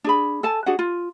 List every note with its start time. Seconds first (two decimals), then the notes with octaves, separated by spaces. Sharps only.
0.04 D4 G#4 B5
0.43 A4 G#5 A5
0.66 D4 F#4 G#4 F#5
0.79 F4